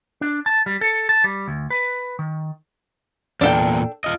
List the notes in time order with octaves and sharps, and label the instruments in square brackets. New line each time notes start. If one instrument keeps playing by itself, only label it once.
[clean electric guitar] D4
A5
G3
A4
A5
G3
D2
B4
D#3
[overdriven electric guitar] E2 A#2 [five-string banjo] D4 A4 G5
[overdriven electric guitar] F4 D#5